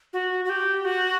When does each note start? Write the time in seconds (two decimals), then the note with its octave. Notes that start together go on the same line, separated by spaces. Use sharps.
0.13 F#4
0.45 F#4
0.49 G4
0.85 F#4